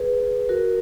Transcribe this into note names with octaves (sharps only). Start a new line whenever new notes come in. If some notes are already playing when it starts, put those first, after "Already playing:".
Already playing: G#4 B4
F#4 A#4